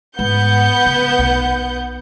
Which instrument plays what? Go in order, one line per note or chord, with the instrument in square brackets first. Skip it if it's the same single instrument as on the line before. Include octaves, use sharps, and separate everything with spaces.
[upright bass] G#2 [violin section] B3 F#5 G6
[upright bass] C#3
B1